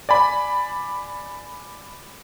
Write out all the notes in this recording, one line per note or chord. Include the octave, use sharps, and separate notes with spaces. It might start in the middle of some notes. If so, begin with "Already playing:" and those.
D5 G#5 B5